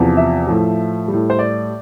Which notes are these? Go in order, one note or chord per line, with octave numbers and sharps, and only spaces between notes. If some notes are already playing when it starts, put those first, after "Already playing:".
Already playing: E2 C3 F3
E5
A2 F3
G3
A2
C5
D5